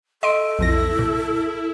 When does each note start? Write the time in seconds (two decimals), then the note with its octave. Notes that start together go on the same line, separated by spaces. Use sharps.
0.23 A4 D#5 C6 D7
0.59 B1 F2 E4 A#6
0.99 A#2